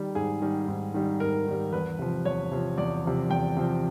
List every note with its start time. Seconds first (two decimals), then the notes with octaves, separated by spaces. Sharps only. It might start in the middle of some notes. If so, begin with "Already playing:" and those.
Already playing: D#3 G3
0.15 G#2 G#4
0.42 D#3 G3
0.68 G#2
0.94 D#3 G3
1.20 G#2 A#4
1.47 D#3 G3
1.73 E2 B4
1.99 C3 F3
2.25 E2 C#5
2.52 C3 F3
2.78 E2 D5
3.04 C3 F3
3.30 E2 G5
3.57 C3 F3